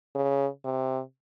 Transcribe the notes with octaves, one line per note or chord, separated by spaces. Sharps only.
C#3
C3